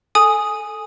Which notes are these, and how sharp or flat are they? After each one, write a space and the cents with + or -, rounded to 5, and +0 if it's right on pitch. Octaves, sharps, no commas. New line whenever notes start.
A4 +0 G#5 +0 D#6 +0